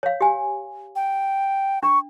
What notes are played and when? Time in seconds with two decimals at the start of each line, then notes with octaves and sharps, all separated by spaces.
0.03 C#5 F5
0.21 G4 G#5
0.96 G5
1.83 D4 C#6